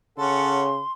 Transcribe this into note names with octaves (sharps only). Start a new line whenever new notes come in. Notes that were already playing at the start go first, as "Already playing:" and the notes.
C#3 C#4 A4 F#5 C6